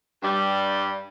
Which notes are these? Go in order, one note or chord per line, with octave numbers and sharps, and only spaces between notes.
G2 G3